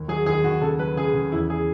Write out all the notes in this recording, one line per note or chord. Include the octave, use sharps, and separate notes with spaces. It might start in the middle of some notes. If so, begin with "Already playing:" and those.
Already playing: D#2
F#3 G#4
D#2 G#4
D#2 F#4
C#3 A4
F#3 B4
C#3 G#4
C#3
E2 E4
G#4